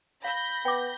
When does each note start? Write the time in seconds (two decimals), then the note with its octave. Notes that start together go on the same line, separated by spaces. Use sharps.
0.24 F5 B5 G6 A#6
0.65 B3 G5 D6